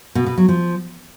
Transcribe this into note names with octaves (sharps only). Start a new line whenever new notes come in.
B2
B2
F#3
F3